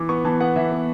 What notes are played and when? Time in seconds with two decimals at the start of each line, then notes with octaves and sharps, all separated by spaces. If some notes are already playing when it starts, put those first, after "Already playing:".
Already playing: E3 D6
0.09 B3 C#6
0.25 E3 A5
0.40 B3 F#5
0.56 E3 E5
0.72 B3